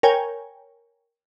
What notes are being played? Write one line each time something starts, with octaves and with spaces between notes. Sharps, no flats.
A#4 C#5 G5 G#5